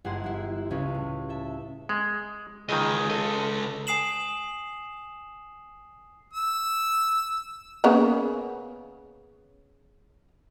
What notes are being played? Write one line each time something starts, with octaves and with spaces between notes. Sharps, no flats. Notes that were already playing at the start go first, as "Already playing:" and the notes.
G1 G#3 E4 G#4 F#5 C6
G3 E4
C#2 C#3 G3 C#4 B4
A2
A4 E5
G#3
C#2 D#3 G#4 D#5
A4 D#5
G#5 D#6 C7 E7 F#7
E6
C#3 A#3 B3